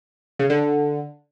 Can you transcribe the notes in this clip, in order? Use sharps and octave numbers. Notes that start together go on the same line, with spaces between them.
C#3
D3